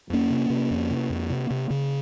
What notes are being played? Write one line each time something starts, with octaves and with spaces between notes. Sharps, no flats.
F2 A#3 C#4
C3
C3
F2
C3
F2
C3
C3
C#3